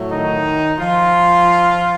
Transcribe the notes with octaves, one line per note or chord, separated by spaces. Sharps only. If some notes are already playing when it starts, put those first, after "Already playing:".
Already playing: A2 F#3 A3
D#3 D#4
F3 F4